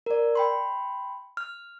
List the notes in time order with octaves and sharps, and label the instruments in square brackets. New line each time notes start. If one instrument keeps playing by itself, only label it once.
[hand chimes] A#4 D5
G5 B5 C6
F6